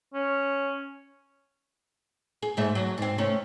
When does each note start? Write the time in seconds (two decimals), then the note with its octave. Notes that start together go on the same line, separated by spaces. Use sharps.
0.14 C#4
2.43 G#4
2.57 G#2 A3 E5
2.75 F#3
2.98 G#2 C4
3.18 C3 A3 C#4